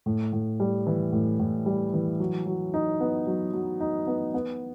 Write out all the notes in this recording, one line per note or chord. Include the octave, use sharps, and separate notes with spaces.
A2
A2
G3
E3
A2
A2
G3
E3
F#3
F#3
D#4
B3
F#3
F#3
D#4
B3
B3